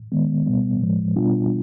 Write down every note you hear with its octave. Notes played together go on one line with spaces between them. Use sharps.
D#3 G#3 B3
B2 G3 B3
A2 F3 G#3
B2 G3 B3 D4 F4